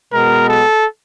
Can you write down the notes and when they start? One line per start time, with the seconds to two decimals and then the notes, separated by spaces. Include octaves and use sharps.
0.12 B2 G#3 B3 A#4
0.48 A4